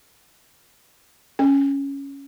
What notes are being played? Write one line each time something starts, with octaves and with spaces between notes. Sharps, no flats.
C#4